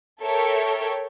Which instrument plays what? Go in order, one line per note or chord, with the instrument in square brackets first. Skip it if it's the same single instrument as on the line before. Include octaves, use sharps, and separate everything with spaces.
[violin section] A4 A#4 C#5 E5 G5